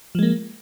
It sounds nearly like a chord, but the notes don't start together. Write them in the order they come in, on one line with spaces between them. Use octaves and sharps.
F3 G#3 A#3